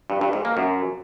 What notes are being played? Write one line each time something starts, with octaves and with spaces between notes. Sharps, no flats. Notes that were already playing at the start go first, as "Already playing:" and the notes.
G2
G2
G#2
A#3
F#2